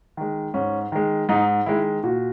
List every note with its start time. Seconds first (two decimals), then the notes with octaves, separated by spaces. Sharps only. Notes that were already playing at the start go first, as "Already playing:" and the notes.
0.17 D#3 G#3
0.54 G#2 C#4
0.92 D#3 G#3
1.29 G#2 D#4
1.66 D#3 G#3 E4
2.04 A#2 F#4